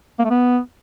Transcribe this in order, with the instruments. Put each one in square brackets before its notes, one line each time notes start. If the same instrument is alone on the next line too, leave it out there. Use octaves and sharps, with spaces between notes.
[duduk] A#3
A3
B3